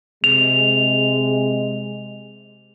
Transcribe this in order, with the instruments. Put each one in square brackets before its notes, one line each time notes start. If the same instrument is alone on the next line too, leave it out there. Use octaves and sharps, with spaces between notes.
[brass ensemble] C3 G#3 [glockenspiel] F7